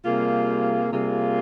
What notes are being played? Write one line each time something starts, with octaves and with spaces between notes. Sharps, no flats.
C3 G3 A#3 F4 G#4
C3 G3 A#3 F4 G#4